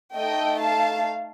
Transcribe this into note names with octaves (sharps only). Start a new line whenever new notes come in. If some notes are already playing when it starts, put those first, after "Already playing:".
A3 D#4 A4 D#5 G5
F5 A5